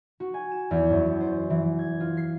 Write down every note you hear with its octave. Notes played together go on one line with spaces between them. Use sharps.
F#4
G#5
E7
E2
F#2
C5
E3
G#6
F4
C7